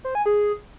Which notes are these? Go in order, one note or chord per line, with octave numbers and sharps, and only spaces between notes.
C5
G#5
G#4